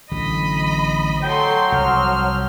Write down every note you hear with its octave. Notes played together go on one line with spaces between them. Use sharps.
A1 D3 F#3 D#5 B5
F#3 A4 G5 C6
C2 F3 F6